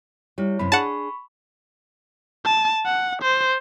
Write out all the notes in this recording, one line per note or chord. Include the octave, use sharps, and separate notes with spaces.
G3 E4 C#5
F#2 C3 C4 B5
D4 G#4 F#5 A5 B5 C#6
A5
F#5
C5